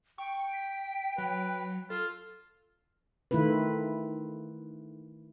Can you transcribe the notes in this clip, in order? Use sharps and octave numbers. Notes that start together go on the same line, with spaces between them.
G5 C#6
B6
F#3 B4
F4 A4
D#3 A3 E4 F4 B4